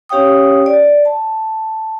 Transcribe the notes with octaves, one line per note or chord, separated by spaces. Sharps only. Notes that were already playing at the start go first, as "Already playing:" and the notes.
C#4 G4 C#5 F5 G5 D#6
D5
A5